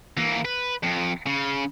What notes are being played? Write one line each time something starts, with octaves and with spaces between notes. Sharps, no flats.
E3 A#3
B4
F2
C#3